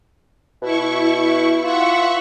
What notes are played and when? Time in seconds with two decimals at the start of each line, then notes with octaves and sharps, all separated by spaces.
0.62 B2 E4 C#6
1.63 F4 E5 F#5 C#6